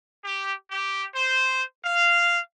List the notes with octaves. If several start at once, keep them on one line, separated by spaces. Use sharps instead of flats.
G4
G4
C5
F5